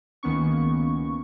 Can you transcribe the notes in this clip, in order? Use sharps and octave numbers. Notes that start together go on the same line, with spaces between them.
C#2 D#3 A#3 B3 C#4 C#6